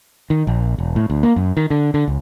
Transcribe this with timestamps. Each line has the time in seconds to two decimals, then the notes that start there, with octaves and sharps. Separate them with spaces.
0.30 D#3
0.47 A#1
0.78 E1
0.96 A2
1.10 D2
1.23 A#3
1.36 F#2
1.57 D#3
1.70 D3
1.94 D3
2.08 C#2